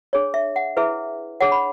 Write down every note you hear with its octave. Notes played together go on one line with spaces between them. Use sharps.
D4 G#4 C#5
E5
F#5
E4 G#4 B4 E5
D4 G#4 C#5 F#5
B5